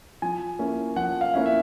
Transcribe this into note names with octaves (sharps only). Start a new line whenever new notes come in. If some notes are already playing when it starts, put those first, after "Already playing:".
F3 G#5
A#3 C#4 E4
F3 F#5
F5
A#3 C#4 E4
E5